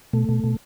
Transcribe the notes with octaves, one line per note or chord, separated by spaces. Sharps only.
B2 A3
B2
B2